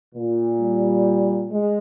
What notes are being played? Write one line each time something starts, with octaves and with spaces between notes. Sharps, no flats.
A#2
G3
G#3